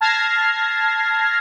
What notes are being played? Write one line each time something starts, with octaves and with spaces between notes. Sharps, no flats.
A5 F6 G#6 A#6 C7